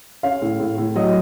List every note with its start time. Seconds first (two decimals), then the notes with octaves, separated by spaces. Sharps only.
0.23 C#4 F5
0.42 A2
0.60 A2
0.78 A2
0.96 F#3 D#5